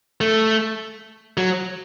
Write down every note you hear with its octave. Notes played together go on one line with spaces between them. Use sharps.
A3
F#3